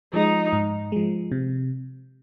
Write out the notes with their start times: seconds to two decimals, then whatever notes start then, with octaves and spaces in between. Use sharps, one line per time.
0.13 F3 G#3 D#4
0.53 G#2
0.92 F3 G#3
1.32 C3